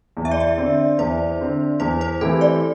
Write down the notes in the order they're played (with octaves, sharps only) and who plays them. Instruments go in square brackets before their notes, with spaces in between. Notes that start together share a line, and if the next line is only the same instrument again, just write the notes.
[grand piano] E2
[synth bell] E5
D5
E5
[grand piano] D3 C4
[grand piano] E2 [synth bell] C5
[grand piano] D3 C4
[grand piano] E2 [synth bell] C5
[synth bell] C5
[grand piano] E3 A3 C4 G4 [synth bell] A4
[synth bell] D5